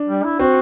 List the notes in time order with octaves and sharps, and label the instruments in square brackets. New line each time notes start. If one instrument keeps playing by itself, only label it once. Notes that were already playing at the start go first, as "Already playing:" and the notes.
Already playing: [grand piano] D4
[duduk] G3
E4
[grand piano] C4 [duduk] F#4